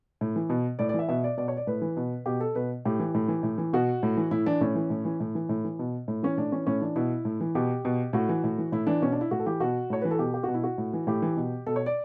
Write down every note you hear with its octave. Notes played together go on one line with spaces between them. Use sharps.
A2
E3
B2
A2 D5
D5
E3 E5
B2 E5
D5
B2 D5
C#5
D5
A2 B4
E3
B2
B2 G4
A4
B2 B4
A2 G4
E3
A2
E3
A2
E3
B2 F#4
A2
E3
A2 E4
E3 D4
A2 C#4
E3
A2
E3
A2
E3
A2
E3
B2
A2
E3 C#4
A2 D4
E3 C#4
A2 C#4
E3 D4
B2 E4
A2
E3
B2 G4
B2
A2 F#4
E3
A2
E3
A2 E4
E3 D4
B2 C#4
D4
E4
A2 F#4
A4
E3 G4
B2 F#4
A2 C#5
E3 B4
A4
B2 G4
G4
B2 F#4
E4
F#4
A2
E3
A2 G4
E3
B2
B2 A4
C#5
D5